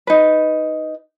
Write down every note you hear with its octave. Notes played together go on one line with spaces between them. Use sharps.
D#4 B4